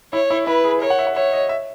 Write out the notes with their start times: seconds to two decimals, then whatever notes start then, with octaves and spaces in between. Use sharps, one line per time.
0.13 E4 C#5
0.31 E4
0.47 E4 B4
0.64 G#4
0.81 A#4 C#5
0.90 F#5
0.99 E5
1.07 F#5
1.16 C#5 E5
1.33 D#5
1.49 E5